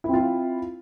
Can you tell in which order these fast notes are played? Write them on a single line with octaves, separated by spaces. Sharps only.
E4 C4 F4